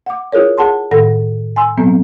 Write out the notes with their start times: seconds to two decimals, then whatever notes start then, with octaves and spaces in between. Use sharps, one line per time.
0.06 F#5 D6
0.32 E4 F4 G#4 A#4 C#5
0.58 G#4 F#5 A5 C6
0.91 A2 D#3 A4 F#5 A#6
1.56 G#5 C6 E6
1.77 B2 F#3 B3 C4